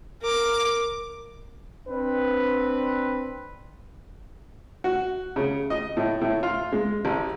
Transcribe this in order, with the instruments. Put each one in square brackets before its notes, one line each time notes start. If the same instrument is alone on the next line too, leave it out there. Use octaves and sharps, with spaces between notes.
[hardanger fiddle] A#4 D6
[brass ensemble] C4 D4 B4
[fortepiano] F#4
C#3
D#5
A2
A2
F4
G#3
A1